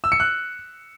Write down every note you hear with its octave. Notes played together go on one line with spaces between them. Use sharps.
E6
C#7
F#6